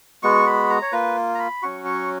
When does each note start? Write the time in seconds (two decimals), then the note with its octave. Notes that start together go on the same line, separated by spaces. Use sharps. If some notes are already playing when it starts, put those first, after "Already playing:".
0.23 G#3 B3 F#4 C#6
0.47 B5
0.70 A#5
0.82 C#5
0.92 A#3 F4 B4
1.35 A#5
1.39 B5
1.63 F#3 C#4 F#4 C#6
1.85 C#6